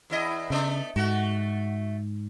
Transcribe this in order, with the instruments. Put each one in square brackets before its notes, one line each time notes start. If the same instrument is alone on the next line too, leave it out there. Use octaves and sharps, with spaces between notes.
[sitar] E2 E4 D#5
[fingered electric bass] C#3 [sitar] A3 B3 D4
[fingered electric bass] G#2 [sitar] A3 F#4